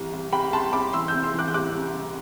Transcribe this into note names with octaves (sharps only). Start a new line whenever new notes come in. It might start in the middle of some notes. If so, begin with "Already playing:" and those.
Already playing: C2 E3
C2
C2 G5 B5
C2 A5 C6
C2 B5 D6
E3 C6 E6
E6 G6
C3
C6 E6
E3 D6 F#6
G6
C2 D6 F#6
C2
C3